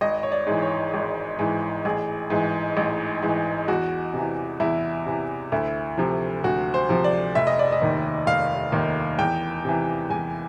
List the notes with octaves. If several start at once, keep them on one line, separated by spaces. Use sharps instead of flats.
G#1 D#5
C#5
D5
G#2 E3
C#5
G#1
G#2 E3
A1 G#4
G#2 E3
A1
G#2 E3
E2 F#4
C3 E3
E2 E4
C3 E3
D2 E4
C3 F3
D2 F#4
C5
C3 F3
D5
F1 E5
D#5
D5
D#5
D#2 D#3
F1 F5
D#2 D#3
E2 G5
C3 E3
E2 G#5